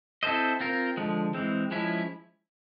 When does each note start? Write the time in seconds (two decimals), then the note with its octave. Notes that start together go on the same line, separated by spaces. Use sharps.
0.23 C4 E4 A4 C5 D#5
0.60 C4 F4 A#4
0.97 D3 F3 G#3
1.34 E3 G#3 C4
1.71 F3 G#3 C#4 E4